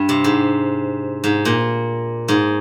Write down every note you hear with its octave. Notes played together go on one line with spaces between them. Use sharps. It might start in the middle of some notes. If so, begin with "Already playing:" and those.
Already playing: G2
C3
G#2
G#2
A#2
G#2